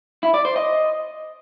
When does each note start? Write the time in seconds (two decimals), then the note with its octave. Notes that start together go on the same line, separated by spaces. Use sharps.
0.23 E4
0.34 D5
0.45 C5
0.56 D#5